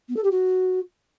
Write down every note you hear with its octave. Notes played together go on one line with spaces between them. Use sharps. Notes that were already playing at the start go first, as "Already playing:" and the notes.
B3
A4
G4
F#4